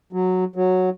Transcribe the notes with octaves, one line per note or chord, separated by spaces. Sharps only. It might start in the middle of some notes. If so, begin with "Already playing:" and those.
F#3
F#3